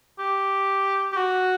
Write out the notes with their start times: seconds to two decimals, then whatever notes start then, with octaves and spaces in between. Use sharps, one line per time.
0.19 G4
1.12 G4
1.17 F#4